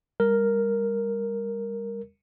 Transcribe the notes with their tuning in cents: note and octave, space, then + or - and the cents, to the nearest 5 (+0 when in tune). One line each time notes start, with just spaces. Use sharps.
G3 +30 A#4 +0